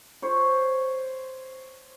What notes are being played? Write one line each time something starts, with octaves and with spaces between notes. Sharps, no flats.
C5 C#5